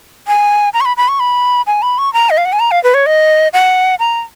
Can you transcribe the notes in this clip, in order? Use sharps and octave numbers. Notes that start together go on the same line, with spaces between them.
G#5
A#5
C#6
B5
B5
C#6
B5
G#5
B5
C#6
A#5
D#5
F5
F#5
G#5
A#5
F5
B4
C#5
D#5
F#5
A#5